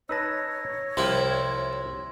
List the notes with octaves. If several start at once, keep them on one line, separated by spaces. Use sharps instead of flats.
D#4 B4 C#5 A5 E6 A#6
C2 C3 F3 E4 G4 F5 C6